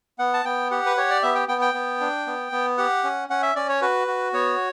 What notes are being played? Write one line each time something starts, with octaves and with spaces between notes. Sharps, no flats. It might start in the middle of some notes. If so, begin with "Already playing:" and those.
B3 F#5
A5
B3 G5
G4 F#5
B4
G4 C#5
D5
B3 E5
G5
B3 G5
G5
B3
D4
B3
B3
G4 F#5
C#4
C#4 F#5
E5
C#4 D5
C#5
F#4 B4
F#4
B3 C#5